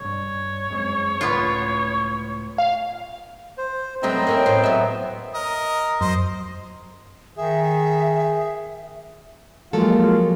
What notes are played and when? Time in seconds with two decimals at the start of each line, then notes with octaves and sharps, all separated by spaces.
0.01 B1 G2 C#5
0.70 F#2 G#3 C4
1.21 C#2 A2 B3 F4
2.58 F5
3.58 C5
4.03 F#2 A3 B3 C4 D#5 G5 A#5
4.27 A#3 C#4 E4
4.46 A2 C5
4.64 F#3 B3 E5
5.34 A#4 D#5
6.01 F#2 C5 D#5
7.37 D#3 G#4 E5
9.73 F3 F#3 G#3 A#3 F4 A4